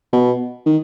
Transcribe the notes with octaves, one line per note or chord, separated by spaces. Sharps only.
B2
D#3